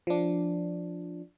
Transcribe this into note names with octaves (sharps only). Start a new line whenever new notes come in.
F3 D4